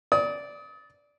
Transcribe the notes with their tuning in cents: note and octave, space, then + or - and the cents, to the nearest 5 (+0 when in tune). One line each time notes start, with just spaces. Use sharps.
D5 -10 D#6 +35